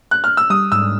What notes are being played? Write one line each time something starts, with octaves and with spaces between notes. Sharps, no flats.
F#6
F6
E6
G3 D#6
G#2 E6